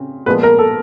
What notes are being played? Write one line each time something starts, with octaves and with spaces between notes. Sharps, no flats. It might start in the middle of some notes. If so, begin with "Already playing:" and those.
Already playing: C#3 C4
A#2 F3 G#3 B3 B4
A#4
A4